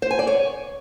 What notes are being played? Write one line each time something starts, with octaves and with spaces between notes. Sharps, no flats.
C5
G#5
D5
C#5